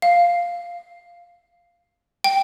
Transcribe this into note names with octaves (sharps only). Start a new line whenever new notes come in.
F5
G5